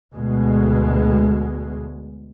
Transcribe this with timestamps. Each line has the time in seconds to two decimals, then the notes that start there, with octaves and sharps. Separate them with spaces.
0.13 D2 B2 G#3